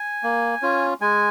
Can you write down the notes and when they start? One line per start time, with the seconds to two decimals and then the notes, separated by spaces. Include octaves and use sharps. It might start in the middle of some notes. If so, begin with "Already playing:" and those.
Already playing: G#5
0.23 A#3
0.62 C#4 F4
1.01 G#3 G#5